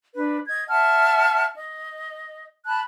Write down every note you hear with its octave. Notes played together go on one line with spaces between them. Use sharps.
D4 B4
D#5 G#6
E5 F#5 A5 F6
D#5
A5 B5 F#6